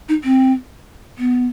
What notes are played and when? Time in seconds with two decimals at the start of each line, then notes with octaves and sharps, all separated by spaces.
0.09 D#4
0.24 C4
1.18 B3